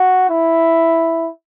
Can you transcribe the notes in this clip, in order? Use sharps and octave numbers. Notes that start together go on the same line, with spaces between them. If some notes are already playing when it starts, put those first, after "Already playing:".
Already playing: F#4
E4